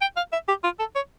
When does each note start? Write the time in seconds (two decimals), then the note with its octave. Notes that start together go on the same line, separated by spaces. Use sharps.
0.01 G5
0.17 F5
0.33 E5
0.48 G4
0.64 F4
0.80 A4
0.96 C#5